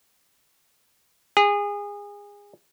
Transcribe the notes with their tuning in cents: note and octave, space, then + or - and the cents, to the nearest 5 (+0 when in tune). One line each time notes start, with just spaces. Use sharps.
G#4 -25